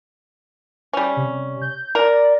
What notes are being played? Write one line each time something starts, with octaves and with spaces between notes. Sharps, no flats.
G3 C#4
C3
G6
A#4 D5